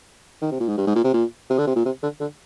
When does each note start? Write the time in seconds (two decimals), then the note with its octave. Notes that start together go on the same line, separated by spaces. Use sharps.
0.42 D#3
0.52 C3
0.60 A#2
0.69 G#2
0.78 G2
0.87 G#2
0.96 A#2
1.04 C3
1.13 A#2
1.50 C3
1.58 D3
1.67 C3
1.76 A#2
1.85 C3
2.03 D3
2.20 D3